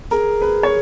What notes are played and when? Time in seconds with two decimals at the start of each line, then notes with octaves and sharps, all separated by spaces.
0.11 G#4 A#4
0.41 B4
0.63 C#5